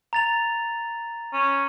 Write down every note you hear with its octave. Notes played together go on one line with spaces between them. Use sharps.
A#5 A6 F7
C#4